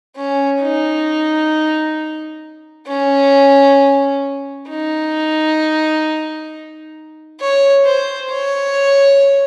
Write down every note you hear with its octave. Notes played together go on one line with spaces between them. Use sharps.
C#4
D#4
C#4
D#4
C#5
C5
C#5